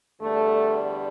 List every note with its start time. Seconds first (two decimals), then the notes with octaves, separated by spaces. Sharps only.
0.20 E2 D3 G3 A3